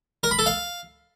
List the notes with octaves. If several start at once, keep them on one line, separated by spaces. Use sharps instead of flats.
A#4
B5
A4
F5